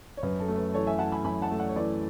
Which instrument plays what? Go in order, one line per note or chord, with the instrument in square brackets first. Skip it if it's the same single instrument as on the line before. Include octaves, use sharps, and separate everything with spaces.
[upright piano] C#5
[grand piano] F#2 [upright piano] B4
[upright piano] A4
[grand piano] A3
[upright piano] B4
[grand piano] E3 [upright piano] A4 C#5
[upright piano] E5 G#5
[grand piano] E4 [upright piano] F#5 A5
[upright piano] G#5 B5
[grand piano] F#2 [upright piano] G#5 B5
[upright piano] F#5 A5
[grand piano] A3
[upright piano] D5 F#5
C#5
[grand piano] E3 [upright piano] B4 D5